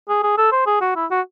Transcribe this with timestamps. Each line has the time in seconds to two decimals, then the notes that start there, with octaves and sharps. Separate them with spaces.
0.09 G#4
0.23 G#4
0.38 A4
0.52 C5
0.67 G#4
0.81 F#4
0.96 E4
1.10 F#4